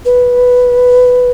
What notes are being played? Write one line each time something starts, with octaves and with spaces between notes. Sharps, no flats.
B4